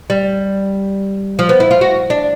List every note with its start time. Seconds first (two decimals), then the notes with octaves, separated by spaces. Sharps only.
0.10 G3
1.39 F3
1.49 B3
1.60 E4
1.71 F4
1.81 F#4
2.10 D4